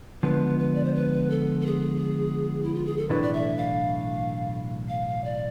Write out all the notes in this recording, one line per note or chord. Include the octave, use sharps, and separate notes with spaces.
D3 F3 G#3 B3 B4
B4
D5
C5
B4
A4
A4
G#4
E4
F4
G#4
A4
B1 A2 E3 A3 D4 B4
D5
E5
F5
F5
D5